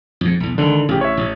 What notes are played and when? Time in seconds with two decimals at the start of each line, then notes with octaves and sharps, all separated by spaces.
0.21 F2 G#2
0.40 B1 E2
0.58 G#1 D3 D#3
0.89 A1 C#3 G4
1.01 C#5 E5
1.17 A1